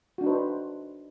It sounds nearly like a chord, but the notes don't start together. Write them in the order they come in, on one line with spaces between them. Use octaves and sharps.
F#4 D4 D#4 B4 C5